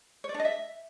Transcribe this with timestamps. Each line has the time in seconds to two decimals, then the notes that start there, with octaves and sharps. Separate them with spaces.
0.24 C#5
0.29 D5
0.34 D4
0.40 D#5
0.45 E5